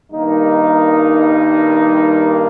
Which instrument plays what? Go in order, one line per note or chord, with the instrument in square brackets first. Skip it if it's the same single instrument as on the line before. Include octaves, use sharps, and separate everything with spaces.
[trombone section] G2 D#3 G3 A#3 D#4